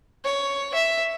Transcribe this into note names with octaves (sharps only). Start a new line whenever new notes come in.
C#5
E5